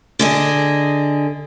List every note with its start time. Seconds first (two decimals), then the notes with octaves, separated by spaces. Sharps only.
0.19 D3 G#4 D#5